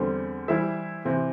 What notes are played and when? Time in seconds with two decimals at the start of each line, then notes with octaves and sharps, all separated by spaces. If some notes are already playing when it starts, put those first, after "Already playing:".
Already playing: E2 D3 G3 C4
0.48 E3 G3 E4 C5 E5
1.05 C3 E3 C4